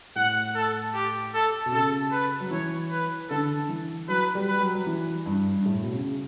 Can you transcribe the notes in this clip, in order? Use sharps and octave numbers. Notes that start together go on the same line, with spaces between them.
A2 F#5
A4
G4
A4
B2
C#3 A4
B4
F#3
E3 C#5
B4
D3 A4
E3
F#3 B4
G3
B4
F#3
F#3
E3
G2
G2
A2
B2
C#3